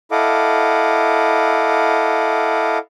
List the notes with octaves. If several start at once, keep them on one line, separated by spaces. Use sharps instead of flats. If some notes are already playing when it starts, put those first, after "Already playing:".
E4 A4 D#5 F5 F#5 D6